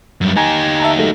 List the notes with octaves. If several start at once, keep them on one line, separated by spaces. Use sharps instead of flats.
F#2 G3
D#4 G4 G#5 A#5 G#6
E5 A5 A#5
F#3 G#3 A3